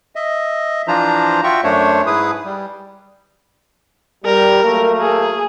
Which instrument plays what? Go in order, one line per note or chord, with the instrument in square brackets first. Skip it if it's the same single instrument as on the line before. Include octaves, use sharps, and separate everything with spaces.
[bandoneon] D#5 E5
E3 F3 D4 F4 C5 A#5
F4 F#4 E5 G5 C#6
F#2 A3 D4 C5 C#5
G#2 E4 G#4 B4 D#6
G3
[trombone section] G3 [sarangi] A#4
[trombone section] F#3 A3 A#3
[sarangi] G#4